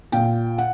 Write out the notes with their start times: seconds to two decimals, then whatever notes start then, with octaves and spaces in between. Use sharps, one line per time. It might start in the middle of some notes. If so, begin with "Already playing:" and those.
0.12 A#2 G5
0.58 F#5